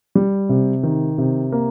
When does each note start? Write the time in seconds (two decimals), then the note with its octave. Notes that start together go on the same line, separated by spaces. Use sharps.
0.15 G3
0.49 C3
0.83 D#3
1.18 C3
1.52 A#3